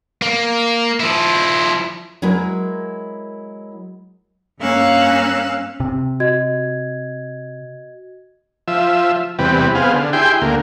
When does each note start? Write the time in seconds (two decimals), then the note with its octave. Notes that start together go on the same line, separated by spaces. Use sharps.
0.22 A#3
1.00 F3 E4
2.22 F#3 G#3 E4 A#4 B4
4.59 G2 A#3 C#4 F5 E6 F#6
5.80 C3
6.20 F#4 D#5 G#6
8.68 F3 E5
9.39 E2 C3 G3 B4
9.75 B3 C4 G#4 F5
9.93 D3
10.13 E4 G4 G#4 G5 C6
10.42 D2 A#3